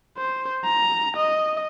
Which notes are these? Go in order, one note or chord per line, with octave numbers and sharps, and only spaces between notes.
C5
A#5
D#5